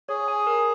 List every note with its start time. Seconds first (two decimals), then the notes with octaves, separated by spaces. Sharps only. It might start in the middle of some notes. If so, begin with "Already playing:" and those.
0.09 G#4 C#5
0.28 G#5
0.47 A#4